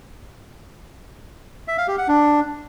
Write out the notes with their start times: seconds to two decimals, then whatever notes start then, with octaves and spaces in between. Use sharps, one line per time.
1.68 E5
1.78 F5
1.88 G4
1.98 F#5
2.08 D4